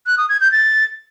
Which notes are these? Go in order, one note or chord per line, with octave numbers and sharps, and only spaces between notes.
F#6
D#6
G#6
G6
A6